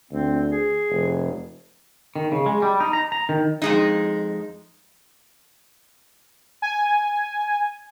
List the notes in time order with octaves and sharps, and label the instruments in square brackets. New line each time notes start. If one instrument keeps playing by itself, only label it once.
[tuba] D2 [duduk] C4
[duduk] G#4
[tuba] F1
[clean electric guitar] D#3
C#3
G#3
G3
D#4
A#5
A#5
D#3
[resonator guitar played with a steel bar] F2 G#3 D#4
[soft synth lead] G#5